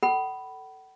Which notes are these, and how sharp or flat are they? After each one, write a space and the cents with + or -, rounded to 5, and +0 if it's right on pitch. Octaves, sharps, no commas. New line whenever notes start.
A4 +10 F#5 +45 B5 +0